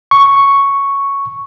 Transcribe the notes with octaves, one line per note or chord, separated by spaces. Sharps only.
C#6